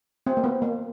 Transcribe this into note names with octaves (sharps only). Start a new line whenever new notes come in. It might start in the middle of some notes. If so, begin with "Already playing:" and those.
C4
A#3
B3
A#3